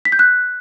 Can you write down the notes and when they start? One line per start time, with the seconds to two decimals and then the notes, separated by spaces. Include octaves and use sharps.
0.05 B6
0.12 G6
0.19 F#6